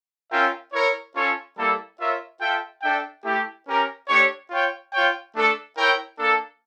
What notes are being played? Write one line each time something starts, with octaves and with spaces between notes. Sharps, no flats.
C#4 F4 A#4 E5 G5
E4 A#4 C#5
C#4 F4 A4 C#5
G3 A#3 E4 A4
F4 A#4 C#5 E5
F4 A4 E5 G5
D4 A4 E5 G5
A3 E4 G4
C#4 G4 A#4
A3 D4 G4 C#5
F4 C#5 G5
F4 C#5 G5
A3 D4 A4
E4 A#4 C#5 G5
A#3 D4 A4